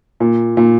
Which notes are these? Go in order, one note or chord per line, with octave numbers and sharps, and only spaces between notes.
A#2
A#2